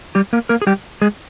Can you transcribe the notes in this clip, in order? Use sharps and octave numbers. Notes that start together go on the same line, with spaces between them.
G3 G4
A#3 A#4
A#3 A#4
G#4
G3 G4
G#3 G#4